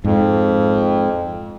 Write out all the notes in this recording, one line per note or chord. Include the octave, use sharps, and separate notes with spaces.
F2 G#2